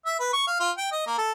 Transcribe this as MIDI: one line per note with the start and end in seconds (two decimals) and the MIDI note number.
0.06 0.17 76
0.19 0.30 71
0.33 0.43 85
0.47 0.55 77
0.60 0.71 65
0.78 0.87 79
0.92 1.07 75
1.07 1.14 58
1.18 1.32 69